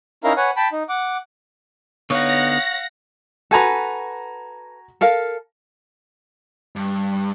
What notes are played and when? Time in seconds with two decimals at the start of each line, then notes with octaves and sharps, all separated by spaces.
0.24 C#4 D#4 E4 A#4 F5 A#5
0.37 B4 C#5 F#5 G#5
0.57 G5 A5 B5
0.72 D#4
0.89 F#5 D6
2.10 D3 B3 D#4 C#5 F5 F#5 A#6
3.51 F#4 A4 B4 G#5 A#5
5.01 A4 A#4 F5
6.76 G2